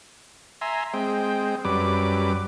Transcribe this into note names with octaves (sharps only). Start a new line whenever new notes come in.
E5 G#5 A#5 C6
G#3 C4 G5
F#2 G3 B4 D6